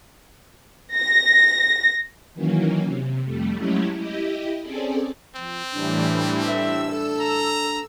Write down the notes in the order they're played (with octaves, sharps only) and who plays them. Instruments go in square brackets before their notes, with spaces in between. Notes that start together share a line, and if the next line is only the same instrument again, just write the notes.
[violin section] A#6
[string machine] D#3 E3 F#3 A#3 C#4
C3
F2 G3 A3
F#3 G#3 A3 C#4 E4 G4
E4 G4 D#5
C4 C#4 G#4 A4 D5
[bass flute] F3 [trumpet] C4
[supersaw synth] A2 E3 G3 [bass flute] D4
[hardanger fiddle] E5 [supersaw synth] E6
[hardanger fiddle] A4
[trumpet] A#5